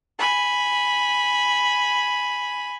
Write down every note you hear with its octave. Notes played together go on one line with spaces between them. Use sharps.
G#5 B5